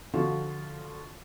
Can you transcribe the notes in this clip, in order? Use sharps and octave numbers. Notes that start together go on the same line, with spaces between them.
D3 F3 F4 F#4